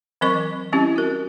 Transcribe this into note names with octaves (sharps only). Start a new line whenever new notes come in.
E3 F#3 C4 A#4 D#5 C#6
G3 C4 C#4 E4 G4
F#4 A#4